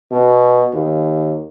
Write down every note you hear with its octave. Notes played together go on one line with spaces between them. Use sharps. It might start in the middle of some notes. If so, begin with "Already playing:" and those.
B2
D#2